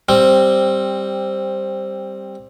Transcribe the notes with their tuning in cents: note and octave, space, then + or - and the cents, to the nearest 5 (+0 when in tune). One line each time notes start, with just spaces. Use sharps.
G3 +5 C4 +10